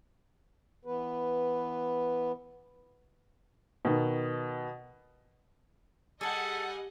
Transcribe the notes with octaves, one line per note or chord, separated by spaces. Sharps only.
E3 B3 B4
B2 D#3
G3 G#4 A4 D#5 F#5 G#5 A5